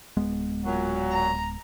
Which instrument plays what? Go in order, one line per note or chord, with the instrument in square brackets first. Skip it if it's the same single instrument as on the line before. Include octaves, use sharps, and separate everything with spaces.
[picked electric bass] D1 G#3 B3
[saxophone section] A#2 F#3
[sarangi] A#5